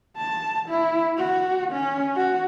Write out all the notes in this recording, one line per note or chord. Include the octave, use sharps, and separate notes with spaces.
A5
E4
F#4
C#4
F#4